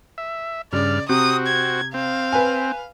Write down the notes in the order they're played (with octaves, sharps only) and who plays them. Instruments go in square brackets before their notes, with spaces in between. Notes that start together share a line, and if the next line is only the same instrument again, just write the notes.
[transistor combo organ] E5
[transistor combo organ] G2 F6 [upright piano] C#3 [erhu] D5
[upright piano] C3 [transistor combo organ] C4 F#4 [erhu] D#6
[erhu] G#6
[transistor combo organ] C4 [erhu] F5
[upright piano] B4 G#5